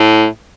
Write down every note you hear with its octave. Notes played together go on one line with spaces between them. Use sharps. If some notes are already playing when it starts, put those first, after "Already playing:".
Already playing: A2